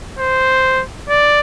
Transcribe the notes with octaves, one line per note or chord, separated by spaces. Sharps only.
C5
D5